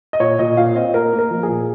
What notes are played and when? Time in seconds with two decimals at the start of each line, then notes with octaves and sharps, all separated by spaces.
0.13 D#5
0.20 A#2 C#5
0.39 A#2 D#5
0.57 A#2 F5
0.75 C4 D#5
0.94 A#3 A#4
1.13 A#3
1.19 A#4
1.31 F3
1.43 G#4
1.48 A#2